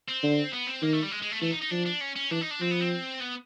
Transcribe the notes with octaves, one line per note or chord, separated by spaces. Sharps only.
C4
D3
B3
C4
D#3 A#3
A3
G3
G#3
G#3
A3
E3 A3
D#4
D#4
F3 D4
D4
C#4
C#4
E3 D4
D#4
D4
F3 C4
B3
C4
B3